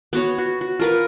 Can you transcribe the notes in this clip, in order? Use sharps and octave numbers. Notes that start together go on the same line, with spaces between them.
B3 F#4 C#5
F#4
F#4
F4 A#4 B4